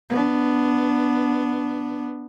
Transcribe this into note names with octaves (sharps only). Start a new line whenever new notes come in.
B3 D4